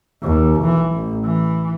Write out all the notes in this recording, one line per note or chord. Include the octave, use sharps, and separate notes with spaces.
D#2
B1 E3
A1
E3